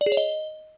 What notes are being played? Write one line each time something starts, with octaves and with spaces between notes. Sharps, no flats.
D5
G#4
C#5
D#5